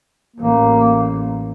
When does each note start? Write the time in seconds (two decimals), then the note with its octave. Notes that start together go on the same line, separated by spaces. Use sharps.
0.36 A1 A#3